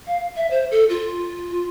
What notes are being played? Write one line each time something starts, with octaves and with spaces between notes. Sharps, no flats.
F5
E5
C5
A4
F4